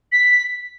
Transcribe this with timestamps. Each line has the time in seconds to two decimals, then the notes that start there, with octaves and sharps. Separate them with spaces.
0.12 B6